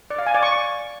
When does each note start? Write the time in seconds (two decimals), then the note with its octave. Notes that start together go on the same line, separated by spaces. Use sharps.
0.10 D5
0.19 F5
0.27 G#5
0.35 D5
0.43 C#6